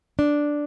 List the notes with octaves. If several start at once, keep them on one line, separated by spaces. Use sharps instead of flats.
D4